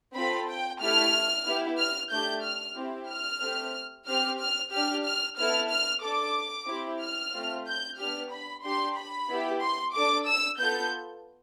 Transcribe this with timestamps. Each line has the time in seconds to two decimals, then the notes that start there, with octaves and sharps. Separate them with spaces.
0.15 C4 F4 A4 B5
0.49 G5
0.81 A3 E4 G4 F6
1.46 B3 E4 G4
1.79 F6
2.12 A3 D4 G4 G6
2.44 F6
2.77 C4 E4 G4
3.10 F6
3.42 A3 C4 G4
4.07 C4 G4 F6
4.40 F6
4.72 D4 G4 F6
5.05 F6
5.37 B3 E4 A4 F6
5.71 F6
6.03 D4 A4 D6
6.68 C4 E4 G4
7.01 F6
7.34 A3 C4 F4
7.67 G6
7.98 B3 D4 G4 F6
8.32 B5
8.64 D4 G4 C6
8.97 B5
9.29 B3 E4 G4
9.62 C6
9.94 D4 A4 D6
10.27 E6
10.60 B3 F4 A4 G6